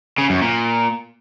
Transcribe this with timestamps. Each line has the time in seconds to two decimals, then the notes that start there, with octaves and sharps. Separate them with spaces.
0.19 C#3
0.30 F#2
0.41 A#2